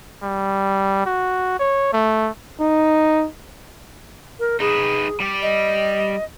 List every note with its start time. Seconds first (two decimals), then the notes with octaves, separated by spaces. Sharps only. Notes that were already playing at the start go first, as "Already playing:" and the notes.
0.23 G3
1.06 F#4
1.59 C#5
1.93 A3
2.60 D#4
4.39 A#4
4.60 D#4 G#4 B4
5.20 G3 D5
5.42 D#5